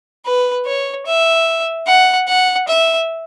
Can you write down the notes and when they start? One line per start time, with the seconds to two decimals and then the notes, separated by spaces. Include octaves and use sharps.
0.25 B4
0.66 C#5
1.06 E5
1.87 F#5
2.28 F#5
2.68 E5